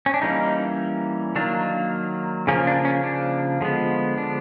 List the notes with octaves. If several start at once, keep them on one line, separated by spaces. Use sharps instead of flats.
C#4
D4
E3 G3 A#3 C#4 D#4
D#3 F#3 A#3 D4
C#3 F3 A#3 C#4
D4
C#4
D4
D3 F3 G#3 B3
D4